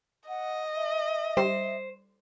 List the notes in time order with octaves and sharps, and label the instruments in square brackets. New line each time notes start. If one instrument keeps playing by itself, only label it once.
[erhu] D#5 [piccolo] F#5
[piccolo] E5
[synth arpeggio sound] G3 [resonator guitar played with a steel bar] C5